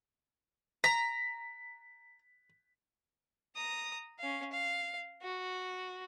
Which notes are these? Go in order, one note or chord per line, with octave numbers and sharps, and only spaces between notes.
A#5 B6
A#5 D#6
C#4 F5
F5
F#4